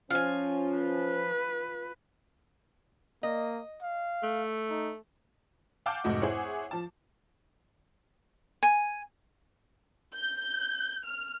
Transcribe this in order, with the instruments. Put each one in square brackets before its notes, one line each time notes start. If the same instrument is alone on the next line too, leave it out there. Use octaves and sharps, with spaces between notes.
[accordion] F3 [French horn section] C#4 [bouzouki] F4 G#5
[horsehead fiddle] B4
[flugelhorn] A#3 [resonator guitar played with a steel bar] D#5
[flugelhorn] F5
[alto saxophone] A3
[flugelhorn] D#4
[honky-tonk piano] F5 F#5 G#5 A5 D6 G6
F1 G#2 A3 F#4 D#5
E4 G#4 C5 C#5 F#5
F3 A5
[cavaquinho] G#5
[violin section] G6
F6